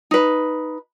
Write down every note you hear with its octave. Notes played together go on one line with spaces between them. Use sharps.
D#4 B4